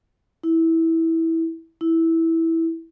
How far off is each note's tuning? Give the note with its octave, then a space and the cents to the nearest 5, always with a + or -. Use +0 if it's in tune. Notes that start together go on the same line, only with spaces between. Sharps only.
E4 -15
E4 -10